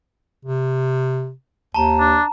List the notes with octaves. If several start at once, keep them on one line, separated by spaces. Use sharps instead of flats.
C3
D#2 A5 A#5
D4